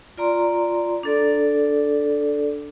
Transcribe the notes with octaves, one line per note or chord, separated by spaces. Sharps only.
F4 D5 A#5 C6
D4 A4 D5